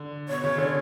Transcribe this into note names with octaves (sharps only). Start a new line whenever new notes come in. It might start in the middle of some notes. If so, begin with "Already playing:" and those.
Already playing: D3
B2 C#5
C#3
D3